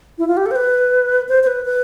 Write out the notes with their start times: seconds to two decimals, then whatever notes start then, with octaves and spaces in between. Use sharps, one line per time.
0.18 E4
0.28 F4
0.37 G4
0.46 A4
0.51 C5
0.56 B4
1.29 C5
1.43 C5
1.47 B4
1.65 B4